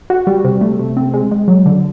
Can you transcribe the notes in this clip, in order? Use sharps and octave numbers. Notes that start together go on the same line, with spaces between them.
F#4
G3
C3
A3
C3
C4
G#3
G#3
F#3
D3